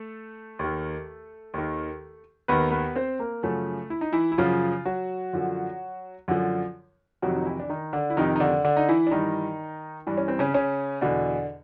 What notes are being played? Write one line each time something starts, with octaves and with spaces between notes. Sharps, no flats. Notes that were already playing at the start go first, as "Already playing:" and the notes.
Already playing: A3 A4
D#2 D#3
D#2 D#3
D#2 D#3 B3 B4
B3 B4
C4 C5
A#3 A#4
F#2 C#3 F3 A3 A4
E4
D#4
E3 E4
E4
F#2 C#3 F3 F4
F#3 F#4
F#2 D3 F3
F#2 D3 F3
F2 C3 D#3 F#3 F#4
D#4
E3 E4
D4
D#3 D#4
D3 D4
E4
F2 C3 D#3 D#4
D#4
D3 D4
D3 D4
D#4
E3 E4
D4
G2 D#3 E3 D#4
G2 E3 D4
C#4
C4
C#3 C#4
C#3 C#4
E2 B2 D3 D4